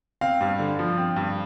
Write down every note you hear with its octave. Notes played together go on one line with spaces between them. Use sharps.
C4 F5
G2
D3
F3
C4
G2